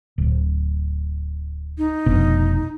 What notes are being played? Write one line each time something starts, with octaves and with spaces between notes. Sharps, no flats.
D1
D#4
F1 B2 D4